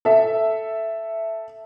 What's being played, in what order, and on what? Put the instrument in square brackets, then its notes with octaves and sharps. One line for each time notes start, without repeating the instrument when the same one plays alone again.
[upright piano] A4 E5